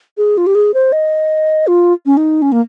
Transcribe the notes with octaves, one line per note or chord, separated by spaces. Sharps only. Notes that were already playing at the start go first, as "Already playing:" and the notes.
G#4
F4
G4
G#4
C5
D#5
F4
C#4
D#4
C#4
A#3